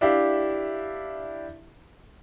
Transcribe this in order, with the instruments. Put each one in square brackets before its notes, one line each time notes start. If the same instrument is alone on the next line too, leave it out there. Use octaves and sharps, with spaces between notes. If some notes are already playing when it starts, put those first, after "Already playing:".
[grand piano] D4 E4 G4 E5 F5